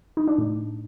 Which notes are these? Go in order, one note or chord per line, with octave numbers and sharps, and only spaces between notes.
D#4
D4
A2